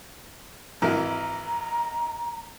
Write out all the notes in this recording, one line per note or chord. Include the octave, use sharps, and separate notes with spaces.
G#1 E3 A#4 A#5